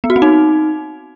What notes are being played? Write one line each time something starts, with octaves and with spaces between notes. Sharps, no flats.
B3
F#4
C4
D#4